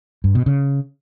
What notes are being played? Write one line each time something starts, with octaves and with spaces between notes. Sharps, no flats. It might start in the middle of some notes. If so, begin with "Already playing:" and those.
G2
B2
C#3